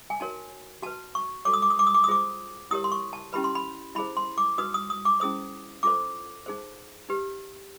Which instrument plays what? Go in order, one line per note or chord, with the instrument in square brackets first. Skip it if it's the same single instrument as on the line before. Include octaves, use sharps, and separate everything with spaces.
[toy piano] G#5
D#4 F#4 A#4 C#5 A5
F#4 B4 A5
C#6
F#4 A4 C#5 D6
D#6
D6
D#6
D6
D#6
D6
D#6
F4 G#4 C5 D6
E4 G4 A#4 C#5 D#6
C6
C#6
A5
C#4 E4 G4 B4 B5
C6
B5
E4 G#4 C5 B5
C6
D6
D#4 F#4 B4 D#6
D#6
D#6
D6
C#4 E4 G#4 C5 D#6
F4 A4 C5 D6
D#4 G#4 C5
D#4 G4 B4